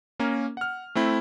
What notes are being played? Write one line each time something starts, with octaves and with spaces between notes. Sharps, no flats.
A#3 C#4 A#4 A#5
F#5 F6
A3 C4 E4